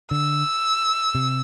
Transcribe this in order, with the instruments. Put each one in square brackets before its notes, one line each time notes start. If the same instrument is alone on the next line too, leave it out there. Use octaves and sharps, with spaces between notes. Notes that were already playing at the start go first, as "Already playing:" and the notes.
[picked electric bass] D3 [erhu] E6
[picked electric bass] C3